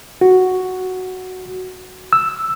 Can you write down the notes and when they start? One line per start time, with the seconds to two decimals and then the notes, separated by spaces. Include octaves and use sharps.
0.21 F#4
2.13 E6